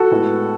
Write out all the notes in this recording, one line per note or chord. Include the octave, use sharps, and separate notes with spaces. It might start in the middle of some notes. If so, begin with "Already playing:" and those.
Already playing: F#4 A4
A2 G#3 B3